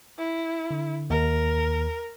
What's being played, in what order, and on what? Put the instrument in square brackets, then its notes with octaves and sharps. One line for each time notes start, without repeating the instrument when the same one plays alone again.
[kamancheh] E4
[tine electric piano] D3
[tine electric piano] D#2 [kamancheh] A#4